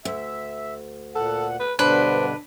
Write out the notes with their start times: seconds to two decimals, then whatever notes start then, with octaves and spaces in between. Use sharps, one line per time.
0.05 D2 E5
1.15 A#2 A4 F#5
1.60 B4
1.79 G2 B2 D3 D4 B4 C5